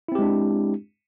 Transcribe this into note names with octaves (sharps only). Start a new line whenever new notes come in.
G#3 C4 D4 E4 G4